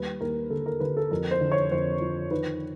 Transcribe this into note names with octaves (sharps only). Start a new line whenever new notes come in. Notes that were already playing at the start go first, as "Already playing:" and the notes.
Already playing: D#2 G3 B4
D#2 A#4
D3 A4
A#4
D3 B4
A4
F2 A#4
C5
D3
C#5
F2 C5
F3
D#3 B4